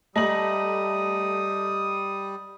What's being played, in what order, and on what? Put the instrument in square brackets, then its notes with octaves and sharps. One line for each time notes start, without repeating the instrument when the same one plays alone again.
[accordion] G3 [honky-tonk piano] A3 A#5 F#7 [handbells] D#5 [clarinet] D#6